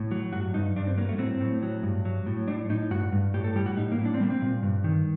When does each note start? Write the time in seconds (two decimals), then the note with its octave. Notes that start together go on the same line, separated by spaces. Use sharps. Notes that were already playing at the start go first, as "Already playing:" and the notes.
Already playing: A2
0.11 F#3
0.33 G2 F#4
0.54 G2 D#4
0.76 G2 D4
0.87 C4
0.98 F#3 A#3
1.09 A3
1.18 A2 C4
1.41 A2
1.63 F#3
1.83 G2
2.05 F#3
2.26 A2
2.48 A2 D4
2.69 A2 D#4
2.91 G2 F#4
3.12 G2
3.34 A2 G4
3.44 A4
3.56 G3 G4
3.66 F#4
3.77 A2 D#4
3.92 A#3
3.98 A2
4.05 D4
4.14 C4
4.20 G3 A#3
4.30 C4
4.42 A#2
4.63 G2
4.84 D#3